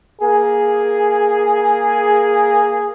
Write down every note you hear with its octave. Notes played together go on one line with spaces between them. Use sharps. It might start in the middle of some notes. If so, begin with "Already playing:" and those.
A#3 G#4